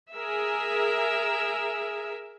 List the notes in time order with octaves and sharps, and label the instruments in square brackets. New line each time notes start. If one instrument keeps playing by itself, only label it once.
[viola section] G#4 A#4 E5